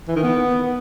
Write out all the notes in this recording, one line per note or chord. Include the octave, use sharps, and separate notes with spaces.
E3
D#3
B3